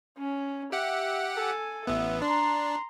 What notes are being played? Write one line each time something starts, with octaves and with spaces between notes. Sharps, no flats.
C#4
G4 E5 F#5
A4 G#5
A1 B3 E5
D4 A#5 C6